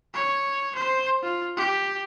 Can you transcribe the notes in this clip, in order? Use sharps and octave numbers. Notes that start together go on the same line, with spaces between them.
C#5
C5
F4
G4